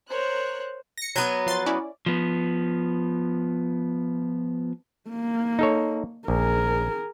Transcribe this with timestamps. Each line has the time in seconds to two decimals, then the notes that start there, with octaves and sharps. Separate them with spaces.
0.10 A#4 C5 C#5 F#6
0.98 A#6 C#7
1.16 F#3 B3 G6 G#6 D#7
1.46 F3 C6 A6
1.66 C#4 E4 D5
2.06 F3 B3
5.10 A#3
5.59 D#4 A4 C#5
6.28 A#1 G#4 A#4